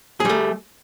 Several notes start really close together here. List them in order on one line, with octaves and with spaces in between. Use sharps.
G#4 G3 A3